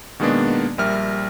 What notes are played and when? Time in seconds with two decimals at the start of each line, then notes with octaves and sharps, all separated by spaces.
0.20 B2 D#3 G#3 A#3 B3 D4
0.78 A#1 G3 A#4 E5 F6